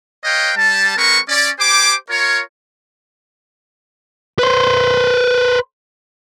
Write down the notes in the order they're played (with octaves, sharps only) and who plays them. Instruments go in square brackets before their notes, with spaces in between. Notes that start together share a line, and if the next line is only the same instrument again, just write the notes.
[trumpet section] B4 C#5 D#5 F5 G5
G3 A5
G#3 C4 A#4 B4 C#6
C#4 D5
G4 C5 G#5 D6
F4 A#4 C#5
[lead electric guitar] B4 C5